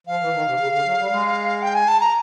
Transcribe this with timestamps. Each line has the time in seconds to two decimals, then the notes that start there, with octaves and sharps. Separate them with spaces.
0.07 F3 F5
0.21 E3
0.33 D#3
0.45 C3
0.59 C#3
0.71 D3
0.85 F#3
0.98 G3
1.10 G#3
1.62 G5
1.74 G#5
1.88 A5
2.00 A#5